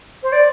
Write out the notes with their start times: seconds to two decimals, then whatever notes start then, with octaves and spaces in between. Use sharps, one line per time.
0.23 C5
0.32 D5